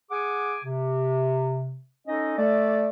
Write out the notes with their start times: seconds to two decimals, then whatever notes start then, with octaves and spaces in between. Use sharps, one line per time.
0.11 G#4 F#5 G#5 D6
0.64 C3
2.07 C#4 D#4 A4 D#5
2.38 A3 A4 D5